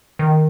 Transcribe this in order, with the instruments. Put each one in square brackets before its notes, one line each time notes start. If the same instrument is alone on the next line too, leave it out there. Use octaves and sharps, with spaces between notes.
[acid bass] D#3